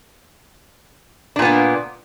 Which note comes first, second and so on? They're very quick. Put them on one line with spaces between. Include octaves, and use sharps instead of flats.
D4 A#2 B3 A#3